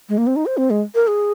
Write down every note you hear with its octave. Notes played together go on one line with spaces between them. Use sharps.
G#3
A#3
C4
D#4
C5
C4
G#3
A#4
G#4